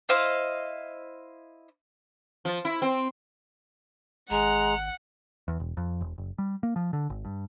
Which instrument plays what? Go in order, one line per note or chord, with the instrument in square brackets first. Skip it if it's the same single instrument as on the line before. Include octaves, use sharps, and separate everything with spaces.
[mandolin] E4 C5 D#5 F5
[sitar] F3
E4
C4
[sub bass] G#1 [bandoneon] G#3 [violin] F#5 [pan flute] A#5
[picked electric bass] E2
E1
F2
E1
F#1
G3
A#3
F3
D3
G#1
G2